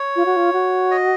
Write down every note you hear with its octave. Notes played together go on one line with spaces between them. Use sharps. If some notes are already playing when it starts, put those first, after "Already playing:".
Already playing: C#5
F4
F#4
F4
F#4
D#5